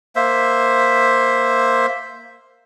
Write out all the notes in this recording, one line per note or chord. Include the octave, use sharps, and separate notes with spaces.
A#3 C5 E5